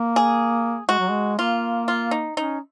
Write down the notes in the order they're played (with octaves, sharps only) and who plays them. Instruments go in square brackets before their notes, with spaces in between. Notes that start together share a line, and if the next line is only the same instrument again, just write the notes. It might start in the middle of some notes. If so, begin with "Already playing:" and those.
Already playing: [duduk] A#3
[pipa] G#4
[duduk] G#3 [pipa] F#4
[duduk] F#3
G#3
[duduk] A#3 [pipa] F4
[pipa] F4
D#4
[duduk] C#4 [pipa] D#4